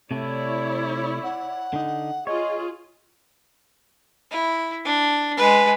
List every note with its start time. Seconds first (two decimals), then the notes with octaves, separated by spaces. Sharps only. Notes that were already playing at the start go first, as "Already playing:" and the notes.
0.11 C3 A3 E4 C#5 D5
1.23 F#5
1.73 D3 D#4
2.27 F4 G#4 C#5 D#5
4.32 E4
4.85 D4
5.37 G#3 B4